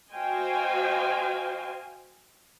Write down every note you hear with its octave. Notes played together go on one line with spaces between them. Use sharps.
F#4 C5 D#5 F5 G5 G#5